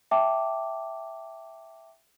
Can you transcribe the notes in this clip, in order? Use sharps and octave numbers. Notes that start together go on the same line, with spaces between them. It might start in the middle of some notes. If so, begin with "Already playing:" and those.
E5 G5 A5 D6